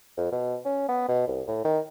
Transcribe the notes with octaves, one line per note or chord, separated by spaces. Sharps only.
F2
B2
C#4
B3
B2
C2
A2
D#3